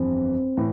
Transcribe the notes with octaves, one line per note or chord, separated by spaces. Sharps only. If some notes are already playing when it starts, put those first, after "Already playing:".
Already playing: G1 F2 E3 G3 C4
A2 E3